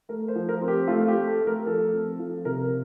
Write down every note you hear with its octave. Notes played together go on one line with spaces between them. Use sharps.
A3 A#4
C5
F3
A#4
C4
G4
A3 F4
G4
A3
A4
A3
A#4
F3 A4
C4
A4
F3
C3 A#4